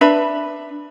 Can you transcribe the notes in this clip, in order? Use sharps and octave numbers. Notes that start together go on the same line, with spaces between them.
D4 B4 E5 B5